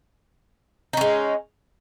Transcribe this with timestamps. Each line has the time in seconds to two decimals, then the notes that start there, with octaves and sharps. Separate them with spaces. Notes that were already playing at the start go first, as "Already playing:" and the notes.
0.93 D#4
0.97 C#4
1.01 G#3